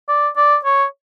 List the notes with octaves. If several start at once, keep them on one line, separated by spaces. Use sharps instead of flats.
D5
D5
C#5